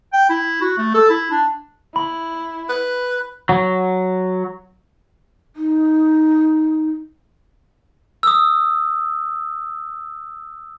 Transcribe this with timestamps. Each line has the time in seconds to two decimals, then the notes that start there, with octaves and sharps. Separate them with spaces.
0.13 G5
0.29 E4
0.61 F#4
0.78 A3
0.94 A4
1.10 E4
1.31 D4
1.96 E4 B5
2.69 B4
3.49 F#3
5.56 D#4
8.23 D#6 E6